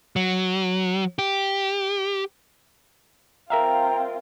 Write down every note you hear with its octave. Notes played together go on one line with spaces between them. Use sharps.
F#3
G4
C4 F4 A#4 E5 F5 G5 A#5